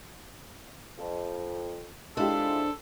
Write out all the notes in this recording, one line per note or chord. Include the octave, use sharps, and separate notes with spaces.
F2
G#3 C4 D4 E4 F4 G4 A4 C5